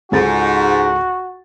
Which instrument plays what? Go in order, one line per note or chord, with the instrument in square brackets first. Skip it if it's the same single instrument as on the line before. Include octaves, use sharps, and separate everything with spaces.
[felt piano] C#2 A4 A6 [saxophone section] G#2 [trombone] F#4